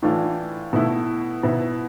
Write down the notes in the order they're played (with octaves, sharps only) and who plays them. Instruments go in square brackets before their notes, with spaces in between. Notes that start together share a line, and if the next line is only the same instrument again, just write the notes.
[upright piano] A2 E3 A3 D4 F4
B2 A3 E4
B2 B3 E4